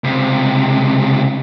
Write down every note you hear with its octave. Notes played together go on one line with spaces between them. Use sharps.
C#2 C3